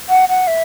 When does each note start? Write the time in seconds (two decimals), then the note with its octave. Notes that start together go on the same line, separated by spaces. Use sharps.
0.09 F#5
0.29 F#5
0.47 E5